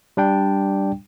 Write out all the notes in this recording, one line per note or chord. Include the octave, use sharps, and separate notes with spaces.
G3 D4 G5